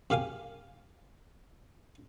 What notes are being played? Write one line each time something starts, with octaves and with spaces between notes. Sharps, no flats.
F#2 G4 F5 G#5 D6